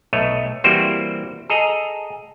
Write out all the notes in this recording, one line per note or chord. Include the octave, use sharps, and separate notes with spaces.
B1 A3 C#5 D#5
E3 G3 A#3 C4 F#4 C5
G#4 A4 D#5 A#5